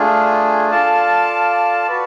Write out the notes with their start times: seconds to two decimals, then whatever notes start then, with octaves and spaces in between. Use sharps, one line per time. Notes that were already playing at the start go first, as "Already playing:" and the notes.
Already playing: A3 D4 F4 G#4
0.71 F4 A4 D5 F5 A5
1.87 F#4 B4 D5